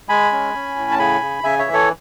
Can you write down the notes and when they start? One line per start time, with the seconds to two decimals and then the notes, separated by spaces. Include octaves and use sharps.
0.09 G#3 G#5 B5
0.32 C#4
0.54 C#4
0.76 A2
0.91 A5
0.99 C#3 G#5 B5
1.21 C#3
1.43 C#3 E5 G#5
1.59 C#5 E5
1.66 E3
1.73 A4 C#5